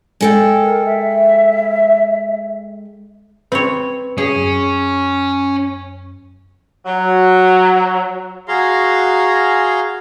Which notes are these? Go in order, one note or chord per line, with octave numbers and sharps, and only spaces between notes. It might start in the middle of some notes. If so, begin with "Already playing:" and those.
G#3 A4 G5
A#4
E5
C4 B4 C#5
C#4 G#4
F#2
F#3
F#4 G#4 F5 A#5 C6